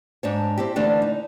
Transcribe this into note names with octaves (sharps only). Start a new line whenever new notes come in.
G#2 D4 C#5
C4 E4 G4
D3 E3 A3 D4
D#4